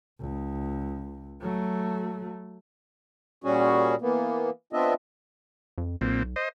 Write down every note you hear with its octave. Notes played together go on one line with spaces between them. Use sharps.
C#2
F#3 A3
A#2 G3 C#4 F#4 G#4
E3 A#3 B3
B3 C4 D4 F4 D#5 E5
F2
B1 A#2 C4
C5 D#5